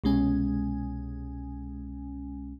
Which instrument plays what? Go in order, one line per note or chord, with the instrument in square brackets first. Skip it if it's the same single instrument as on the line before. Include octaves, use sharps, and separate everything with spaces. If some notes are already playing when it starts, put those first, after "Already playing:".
[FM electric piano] C2 B2 G#3 C#4 G#5